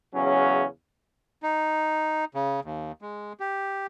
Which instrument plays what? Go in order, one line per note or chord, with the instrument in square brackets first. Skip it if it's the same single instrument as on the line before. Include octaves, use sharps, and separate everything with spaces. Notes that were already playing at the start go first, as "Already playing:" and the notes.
[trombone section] E2 C#3 F#3 C#4
[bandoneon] D#4
C#3
D#2
G#3
G4